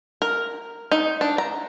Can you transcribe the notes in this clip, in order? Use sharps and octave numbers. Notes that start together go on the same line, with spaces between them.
A#4
D#4
D4
A#5